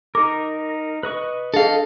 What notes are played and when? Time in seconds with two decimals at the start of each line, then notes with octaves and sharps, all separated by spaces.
0.15 D#4 A#4 D6
1.03 B4 D#5 C#6
1.54 D4 G#4 A4 D#5 F5